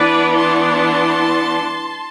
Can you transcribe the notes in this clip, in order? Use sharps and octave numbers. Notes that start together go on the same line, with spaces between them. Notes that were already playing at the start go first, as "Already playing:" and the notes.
Already playing: E3 B3 D4 B4 D5
A5 C6